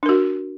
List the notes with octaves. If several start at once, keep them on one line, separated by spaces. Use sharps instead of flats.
D4 F#4 A#4